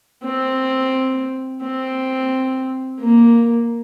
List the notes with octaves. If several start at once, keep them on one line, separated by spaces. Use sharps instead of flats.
C4
C4
A#3